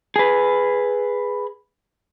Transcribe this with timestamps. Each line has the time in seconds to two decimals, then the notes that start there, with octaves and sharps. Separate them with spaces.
0.16 G#4 B4